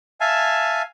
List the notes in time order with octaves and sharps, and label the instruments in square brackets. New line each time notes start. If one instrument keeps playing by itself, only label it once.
[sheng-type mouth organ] E5 F5 G#5 A5